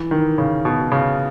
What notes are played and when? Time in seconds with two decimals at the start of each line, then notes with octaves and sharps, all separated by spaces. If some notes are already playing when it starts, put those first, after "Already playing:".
Already playing: E3
0.11 D#3
0.38 C#3
0.65 B2
0.92 C#3